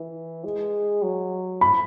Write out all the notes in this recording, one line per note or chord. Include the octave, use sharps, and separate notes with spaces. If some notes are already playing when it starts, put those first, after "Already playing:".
Already playing: E3
G#3
F#3
B5